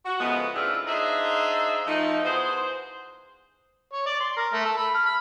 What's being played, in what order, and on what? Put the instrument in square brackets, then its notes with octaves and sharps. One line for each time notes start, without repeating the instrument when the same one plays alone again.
[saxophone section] F#4
C#3 F3 G#3 A3 B3
A2 C#3 C4 D4 E4 F4
A#3 D4 D#4 G#4 C5 E5
F3 A3 D#4
E2 F#4 G#4 C5
[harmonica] C#5
D5
C6
A#4
A3
A4
B5
F6
B5